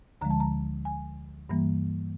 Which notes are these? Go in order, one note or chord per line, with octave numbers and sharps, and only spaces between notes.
D2 D3 F3 G#3 A#5
A5
A#5
G#5
G2 E3 G3 A#3